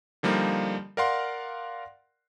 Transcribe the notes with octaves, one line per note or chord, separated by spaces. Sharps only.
D3 F3 G3 A#3 D#4
A#4 D5 F5 F#5 C6